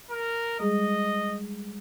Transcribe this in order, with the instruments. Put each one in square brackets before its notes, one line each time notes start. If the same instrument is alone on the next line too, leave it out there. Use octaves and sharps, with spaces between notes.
[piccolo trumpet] A#4
[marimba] G3 G#3 G#4 [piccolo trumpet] D#5